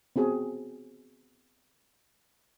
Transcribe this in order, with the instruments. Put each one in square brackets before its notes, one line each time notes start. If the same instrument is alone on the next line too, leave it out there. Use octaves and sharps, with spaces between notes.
[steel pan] B3 C4 F#4 G#4